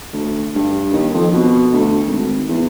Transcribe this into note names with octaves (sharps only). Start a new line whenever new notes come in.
D2
G2
D#2
F2
B2
D2
G#1
E2